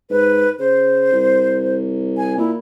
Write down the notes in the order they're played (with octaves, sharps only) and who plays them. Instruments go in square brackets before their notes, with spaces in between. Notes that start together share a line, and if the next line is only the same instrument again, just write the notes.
[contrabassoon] G#2 [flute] B4
[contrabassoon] C#3 [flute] C5
[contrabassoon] C2
[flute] G#5
[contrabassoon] A#2 [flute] E4